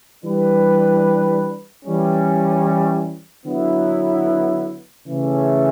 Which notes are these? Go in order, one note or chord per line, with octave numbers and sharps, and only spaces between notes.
E3 G3 D4 G4 B4
E3 G3 C#4
D3 F#3 B3 E4
C#3 E3 A3 C#4